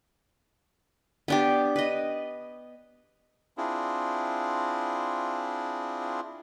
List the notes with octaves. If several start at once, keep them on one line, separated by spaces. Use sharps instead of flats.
B3 D4 G4
B4 D#5
C4 D4 E4 F4 G#4